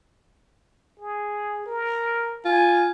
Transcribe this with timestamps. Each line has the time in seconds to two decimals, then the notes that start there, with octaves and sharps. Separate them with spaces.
1.00 G#4
1.66 A#4
2.45 F4 G#5